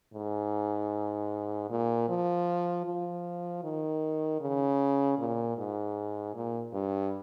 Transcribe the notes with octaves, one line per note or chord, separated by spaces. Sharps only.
G#2
A#2
F3
F3
D#3
C#3
A#2
G#2
A#2
G2